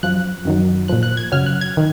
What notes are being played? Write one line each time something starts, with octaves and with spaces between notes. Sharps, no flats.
F#2 F3 F#6
F#2 D#3 F#3
A#2 F3 F#6
F#6
G#6
F#2 C#3 F#3 F6
F#6
G#6
D#3